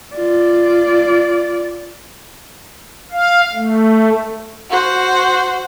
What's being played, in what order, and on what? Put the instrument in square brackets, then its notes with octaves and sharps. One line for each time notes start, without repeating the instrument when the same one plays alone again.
[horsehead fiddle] F4 D5
[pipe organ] F5
A3
[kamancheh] F#4 C5